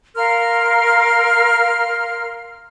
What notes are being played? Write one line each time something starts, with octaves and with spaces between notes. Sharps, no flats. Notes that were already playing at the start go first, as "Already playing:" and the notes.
A#4 F5 C6 F6